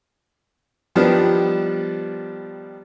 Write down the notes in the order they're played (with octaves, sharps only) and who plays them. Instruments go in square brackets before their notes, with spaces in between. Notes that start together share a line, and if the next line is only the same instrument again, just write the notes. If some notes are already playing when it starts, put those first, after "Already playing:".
[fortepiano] D#3 F3 G3 B3 D4